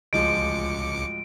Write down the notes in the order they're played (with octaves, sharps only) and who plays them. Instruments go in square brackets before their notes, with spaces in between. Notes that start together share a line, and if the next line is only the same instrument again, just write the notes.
[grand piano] D1 F3 G#3 [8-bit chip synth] C#2 D6 C#7 [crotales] D7